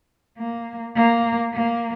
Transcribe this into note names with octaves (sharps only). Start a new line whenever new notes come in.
A#3
A#3
A#3